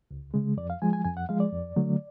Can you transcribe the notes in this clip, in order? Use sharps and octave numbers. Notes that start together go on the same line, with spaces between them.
C#2
C#3 G#3
F2 D5
F5
F3 G#3 G#5
G#5
F2 G#5
F#5
F3 G#3 F5
D5
F2
D3 F#3 A3